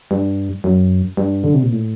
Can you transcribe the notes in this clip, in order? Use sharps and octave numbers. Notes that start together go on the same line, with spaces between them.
G2
F#2
G2
D3
C3
A#2
A2